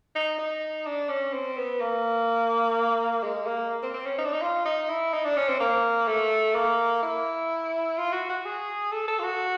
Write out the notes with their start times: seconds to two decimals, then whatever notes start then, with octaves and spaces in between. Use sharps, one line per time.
0.15 D#4
0.39 D#4
0.86 D4
1.09 C#4
1.33 C4
1.57 B3
1.81 A#3
3.23 G#3
3.47 A#3
3.83 C4
3.94 C4
4.06 C#4
4.18 D#4
4.25 D4
4.32 D#4
4.42 F4
4.65 D#4
4.89 E4
5.13 D#4
5.25 D4
5.37 C#4
5.48 C4
5.60 A#3
6.08 A3
6.55 A#3
7.03 E4
7.98 F4
8.13 F#4
8.29 F#4
8.45 G#4
8.92 A4
9.08 A4
9.19 F4
9.23 F#4